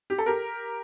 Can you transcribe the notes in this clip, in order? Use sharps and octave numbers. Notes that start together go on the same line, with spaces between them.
G4
A4
G4 A#4